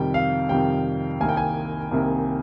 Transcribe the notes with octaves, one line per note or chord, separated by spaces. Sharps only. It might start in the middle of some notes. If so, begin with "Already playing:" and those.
Already playing: F2 C3 D#3 G3 G5
F5
F2 C3 D#3 G3 G5
C2 C3 D#3 A#3 G#5
G5
G#5
C2 C3 D#3 A#3